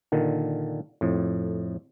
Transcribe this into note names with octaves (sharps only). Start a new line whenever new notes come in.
A#2 D3 D#3
F2 A2